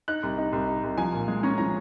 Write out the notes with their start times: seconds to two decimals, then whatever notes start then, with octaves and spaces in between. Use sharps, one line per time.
0.08 D#4 F#6
0.23 C2
0.38 D#4
0.53 C2
0.68 D#4
0.84 C2
0.98 F3 G#5
1.13 A#2
1.28 G#3
1.43 C#4 A#5
1.58 F3 A#5